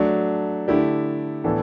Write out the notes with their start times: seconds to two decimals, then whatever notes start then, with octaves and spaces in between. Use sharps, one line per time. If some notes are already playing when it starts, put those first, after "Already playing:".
Already playing: F#3 A3 D4
0.68 D3 A3 E4 G4 D5
1.44 A2 E3 B3 D4 A4